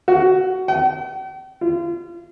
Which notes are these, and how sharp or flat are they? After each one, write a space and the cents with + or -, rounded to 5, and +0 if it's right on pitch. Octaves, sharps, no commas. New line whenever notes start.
F#4 +15
G5 -45
F4 -35